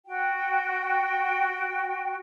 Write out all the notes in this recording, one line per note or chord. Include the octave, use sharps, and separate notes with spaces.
F#4 G5